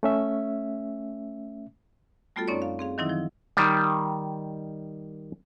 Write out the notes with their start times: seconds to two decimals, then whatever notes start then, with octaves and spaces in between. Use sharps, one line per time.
0.03 A3 C#4 E5
2.36 G3 A3 B3 F4 F#4 A4
2.48 F#2 C4 C#4 D#4 C#5 D5
2.62 F5
2.79 C4 G#4 F5
2.98 D#3 E3 F#3 C4 D#4 E4
3.09 F3
3.57 D#3 G3